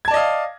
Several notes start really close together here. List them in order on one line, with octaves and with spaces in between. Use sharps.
G#6 A5 D5 D#5 F5